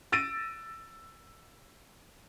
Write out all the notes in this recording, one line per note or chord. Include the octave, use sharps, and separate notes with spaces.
E6 A6 A#6 D7 D#7